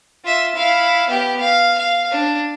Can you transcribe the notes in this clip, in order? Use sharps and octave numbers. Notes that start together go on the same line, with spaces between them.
F4 E5
E4 F5
B3 G4
F5
F5
D4